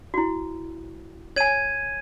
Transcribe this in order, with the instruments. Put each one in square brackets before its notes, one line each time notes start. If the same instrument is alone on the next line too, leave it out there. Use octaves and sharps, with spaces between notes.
[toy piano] E4 F#4
[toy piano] C#5 G#5 [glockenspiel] G#6 D#7